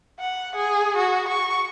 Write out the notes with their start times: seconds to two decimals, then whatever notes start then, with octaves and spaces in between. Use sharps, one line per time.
0.20 F#5
0.56 G#4
0.97 F#4
1.29 C#6